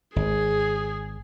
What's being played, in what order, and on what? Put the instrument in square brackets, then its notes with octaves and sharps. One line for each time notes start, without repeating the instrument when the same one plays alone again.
[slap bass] G#1 [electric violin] G#4